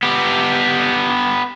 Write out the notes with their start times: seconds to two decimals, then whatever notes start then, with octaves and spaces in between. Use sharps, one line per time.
0.03 B3 G4